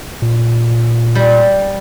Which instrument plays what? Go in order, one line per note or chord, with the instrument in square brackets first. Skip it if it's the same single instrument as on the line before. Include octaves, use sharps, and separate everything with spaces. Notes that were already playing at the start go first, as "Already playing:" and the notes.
[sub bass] A#2
[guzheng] G3